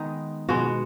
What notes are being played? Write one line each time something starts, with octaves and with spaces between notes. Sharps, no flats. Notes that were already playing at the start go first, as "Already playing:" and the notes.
Already playing: D#3 G#3 B3 D#4
B2 G#3 B3 F#4